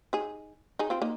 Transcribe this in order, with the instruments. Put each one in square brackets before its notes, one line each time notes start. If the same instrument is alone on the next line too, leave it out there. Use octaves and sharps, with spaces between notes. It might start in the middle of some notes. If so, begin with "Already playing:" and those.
[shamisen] D#4 G#4
D#4 G#4
C4 F4
A#3 D#4